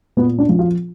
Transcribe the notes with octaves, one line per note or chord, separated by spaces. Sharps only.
A#2 B3
D4
F3
F4